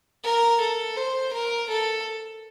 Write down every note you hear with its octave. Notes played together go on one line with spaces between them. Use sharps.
A#4
A4
C5
A#4
A4